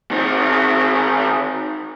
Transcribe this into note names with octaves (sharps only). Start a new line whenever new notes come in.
D#3 C4